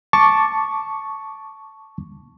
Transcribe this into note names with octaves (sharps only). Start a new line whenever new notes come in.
A5 C#6 D6